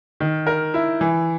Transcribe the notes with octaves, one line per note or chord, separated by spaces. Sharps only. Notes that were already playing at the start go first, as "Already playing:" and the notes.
D#3
A#4
E4
E3